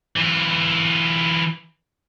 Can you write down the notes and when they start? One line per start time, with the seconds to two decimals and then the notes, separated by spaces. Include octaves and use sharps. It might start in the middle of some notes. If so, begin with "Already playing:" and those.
0.16 E3 F4